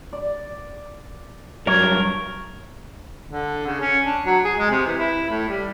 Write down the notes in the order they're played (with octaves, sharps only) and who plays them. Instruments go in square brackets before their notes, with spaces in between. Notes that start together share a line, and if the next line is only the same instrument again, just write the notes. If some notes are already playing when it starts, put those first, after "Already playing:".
[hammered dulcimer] D5
[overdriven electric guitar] G2 F#3 [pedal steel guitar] A#4 [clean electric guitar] C#5
[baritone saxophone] D3
C#3
C#4
D4
F#3
G#4
G#3
C3
E3
E4
A2
G3